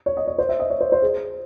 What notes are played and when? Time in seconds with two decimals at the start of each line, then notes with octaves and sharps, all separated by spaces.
0.06 C#5
0.17 D#5
0.27 C#5
0.38 C5
0.49 E5
0.60 D#5
0.70 C#5
0.81 C5
0.92 C5
1.02 G#4